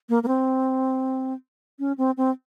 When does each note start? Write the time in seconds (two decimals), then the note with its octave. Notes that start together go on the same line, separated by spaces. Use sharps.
0.09 A#3
0.23 A#3
0.28 C4
1.79 C#4
1.98 C4
2.17 C4